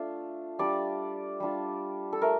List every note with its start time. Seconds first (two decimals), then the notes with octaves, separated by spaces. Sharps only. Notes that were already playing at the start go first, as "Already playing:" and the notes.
Already playing: A3 D4 F4
0.59 G3 D4 F4 D5
1.40 G3 D4 F4
2.13 A4
2.22 A3 A#4